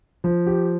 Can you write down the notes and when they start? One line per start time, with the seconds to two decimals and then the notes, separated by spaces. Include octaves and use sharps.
0.24 F3
0.47 G4